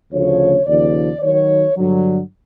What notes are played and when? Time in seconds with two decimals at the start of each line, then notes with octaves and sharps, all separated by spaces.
0.12 D2 C#3 F3 C#5
0.67 D#2 C#3 F3 D5
1.21 D#2 D#3 F#3 C#5
1.76 G2 D3 F#3